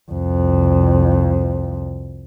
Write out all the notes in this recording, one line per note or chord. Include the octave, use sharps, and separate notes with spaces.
C2 F2